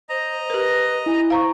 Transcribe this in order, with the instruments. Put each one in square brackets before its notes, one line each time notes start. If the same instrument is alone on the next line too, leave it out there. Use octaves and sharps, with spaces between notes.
[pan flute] C5 [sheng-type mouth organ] D#5 A#5
[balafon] G4 A#4 [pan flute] B4
[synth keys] E4 [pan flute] G#5
[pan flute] C5 [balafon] F5 A#5 C#6